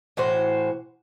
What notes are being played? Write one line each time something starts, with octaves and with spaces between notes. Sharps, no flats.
A2 E3 F#4 C5